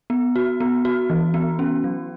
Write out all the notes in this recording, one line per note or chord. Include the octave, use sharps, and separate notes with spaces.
B3
F#4
B3
F#4
E3
B3
C#4
F#3